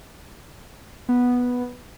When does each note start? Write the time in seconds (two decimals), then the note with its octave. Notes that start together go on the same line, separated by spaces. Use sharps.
1.09 B3